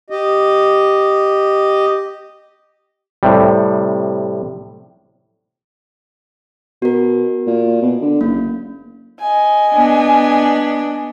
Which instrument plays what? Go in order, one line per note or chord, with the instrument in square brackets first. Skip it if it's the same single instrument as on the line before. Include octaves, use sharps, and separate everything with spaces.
[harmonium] G4 D#5
[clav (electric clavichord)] A2 C3 G3
[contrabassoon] B2 [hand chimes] F#4 A#4
[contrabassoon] A#2
B2
D3
[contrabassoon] F#1 [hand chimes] A#3
[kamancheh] D#5 G#5
[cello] B3 D4